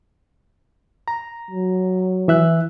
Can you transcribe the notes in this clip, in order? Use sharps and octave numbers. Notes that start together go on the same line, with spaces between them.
A#5
F#3
E3 E5 F#6